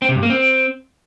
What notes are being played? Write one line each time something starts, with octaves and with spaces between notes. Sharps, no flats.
C4
C3
G2
A#3
C4